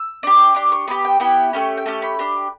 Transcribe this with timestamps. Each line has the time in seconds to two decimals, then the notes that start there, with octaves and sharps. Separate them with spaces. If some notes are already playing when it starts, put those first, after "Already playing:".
Already playing: E6
0.23 D4 G4
0.55 D4 G4 D6
0.72 C#6
0.87 B3 E4 G4 B5
1.05 G5
1.20 B3 E4 G4 G5
1.53 A3 C#4 G4
1.77 G5
1.86 A3 C#4 G4 A5
2.02 B5
2.19 D4 G4